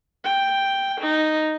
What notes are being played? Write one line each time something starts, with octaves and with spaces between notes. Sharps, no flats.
G5
D#4